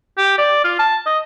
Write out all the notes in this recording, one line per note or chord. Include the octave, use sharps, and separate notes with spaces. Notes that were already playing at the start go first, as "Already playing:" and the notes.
G4
D5
F4
A5
D#5